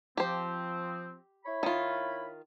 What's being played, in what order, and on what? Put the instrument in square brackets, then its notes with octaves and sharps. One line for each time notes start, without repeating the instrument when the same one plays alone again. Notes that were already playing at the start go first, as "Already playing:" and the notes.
[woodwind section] F3 C4 [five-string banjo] G4 C5
[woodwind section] E4 C#5 B5
[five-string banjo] D#3 F4